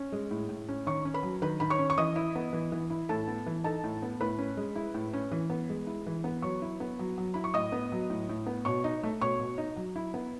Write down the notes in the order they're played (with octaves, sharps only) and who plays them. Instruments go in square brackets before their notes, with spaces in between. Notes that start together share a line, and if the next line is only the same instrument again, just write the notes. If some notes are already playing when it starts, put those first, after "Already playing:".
Already playing: [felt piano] C#4
G#3
A2
A2
C#4
D#3 C#5 C#6
C#4
B4 B5
F#3
D#3 B4 B5
D#3 B5
C#5 C#6
C#4
C#6
E3 D#5 D#6
E4
B3
E3
E3
E4
A2 A4 A5
B3
E3
D#4 A4 A5
A2
B3
A2 B4 B5
C#4
G#3
E4
A2
C#4
E3
B3
G#3
E4
E3
B3
F#3 C#5 C#6
E4
B3
F#3
F#3
E4 B5
C#6
A2 D#5 D#6
B3
F#3
A2
A2
B3
B2 C#5 C#6
D#4
A3
B2 C#5 C#6
B2
D#4
F#3
E4
B3